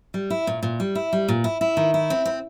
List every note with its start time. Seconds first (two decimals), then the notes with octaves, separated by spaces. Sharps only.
0.14 G3
0.30 E4
0.47 A#2
0.63 A#2
0.80 G3
0.95 E4
1.13 G3
1.28 A#2
1.44 E4
1.61 E4
1.77 D#3
1.94 E4
2.10 C4
2.26 C4